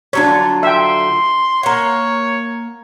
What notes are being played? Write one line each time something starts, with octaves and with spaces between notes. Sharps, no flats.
D3 F#3 D4 F4 C#5
E5 G5 C6
A#3 C#5 F#5